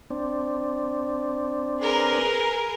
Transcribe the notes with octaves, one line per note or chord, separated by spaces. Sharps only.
C4 D4
G#4 A#4 B4